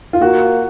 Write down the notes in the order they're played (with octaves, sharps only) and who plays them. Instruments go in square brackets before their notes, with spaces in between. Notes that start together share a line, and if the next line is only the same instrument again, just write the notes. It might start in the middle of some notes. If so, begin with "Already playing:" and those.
[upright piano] F4
[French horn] A#3 [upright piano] F#4